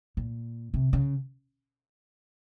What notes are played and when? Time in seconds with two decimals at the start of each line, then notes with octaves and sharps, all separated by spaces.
0.17 A#2
0.74 C3
0.93 C#3